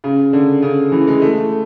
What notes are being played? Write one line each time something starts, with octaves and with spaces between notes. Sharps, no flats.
C#3
D3
C#3
E3
G#3
A3